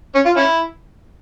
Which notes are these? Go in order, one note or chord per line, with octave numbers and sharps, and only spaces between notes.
C#4
F4
C#4 E4